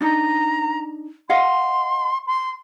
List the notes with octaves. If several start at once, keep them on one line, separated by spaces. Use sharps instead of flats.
D4 D#4 A#5
D#5 F5 F#5 C6
C6